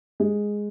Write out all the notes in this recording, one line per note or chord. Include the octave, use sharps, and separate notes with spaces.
G#3